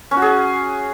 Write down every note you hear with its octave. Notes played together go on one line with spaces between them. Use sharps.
C#4
F#4
G#4